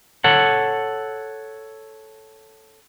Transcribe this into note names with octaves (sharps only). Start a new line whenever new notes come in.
A4 C#5 F#5